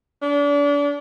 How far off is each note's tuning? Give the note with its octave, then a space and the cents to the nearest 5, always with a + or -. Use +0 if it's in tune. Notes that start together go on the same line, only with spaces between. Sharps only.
D4 -35